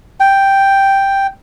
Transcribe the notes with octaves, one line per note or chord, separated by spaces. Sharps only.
G5